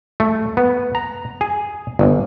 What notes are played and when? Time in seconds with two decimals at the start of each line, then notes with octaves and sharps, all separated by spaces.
0.20 A3
0.57 B3
0.95 A#5
1.41 G#4
1.99 G1